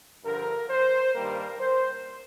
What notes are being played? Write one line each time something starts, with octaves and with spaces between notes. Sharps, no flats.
G2 D3 F3 A#4
C5
G2 D#3 G3 A#3 A#4
C5